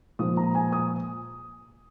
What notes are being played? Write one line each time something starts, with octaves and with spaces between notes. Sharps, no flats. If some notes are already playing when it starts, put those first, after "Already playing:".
A#2 F3 G#3 D#6
A#5
G#5
D#6